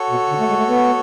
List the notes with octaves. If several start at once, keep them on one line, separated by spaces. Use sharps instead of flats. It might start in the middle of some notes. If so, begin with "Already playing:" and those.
Already playing: F#4 A4 C#5
B2
D3
A3
G#3
A3
B3